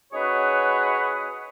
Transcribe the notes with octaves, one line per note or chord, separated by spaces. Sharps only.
C#4 D#4 F#4 G#4 B4 C#5